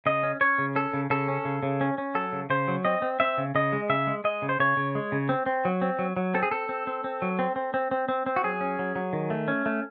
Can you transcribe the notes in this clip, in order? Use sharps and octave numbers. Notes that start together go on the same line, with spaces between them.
C#3 D#5
C#4
C#4 C#5
C#3
C#4 A4
C#3
C#3 A4
C#4
C#3
C#3
C#4
C#4
F#3 A4
C#3
C#3 C5
F#3
C4 D#5
C4
C4 E5
C#3
C#3 D#5
G#3
C#3 E5
G#3
G#3 D#5
C#3
C5
C#3 C#5
C#3
G#3
C#3
C4
C4
F#3
C4
F#3
F#3
C4 A4
G#4
C4 A4
C4
C4
C4
F#3
C4
C4
C4
C4
C4
C4
F#4
F#3 G#4
C#4
F#3
F#3
D#3
A3
C#4
A3